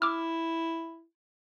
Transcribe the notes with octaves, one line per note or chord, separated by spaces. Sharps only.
E4 D6 E6 F6